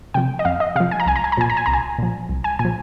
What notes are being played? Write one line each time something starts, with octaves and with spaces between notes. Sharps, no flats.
C3 F3 G5
D#5
F2 F5
D#5
C3 F3 F5
G#5
A#5
C2 G#5
A#5
G#5
A#5
A#2 F3 G#5
A#5
G#5
C2 A#5
G#5
A#2 F3
C2
G#5
A#2 G#5
F3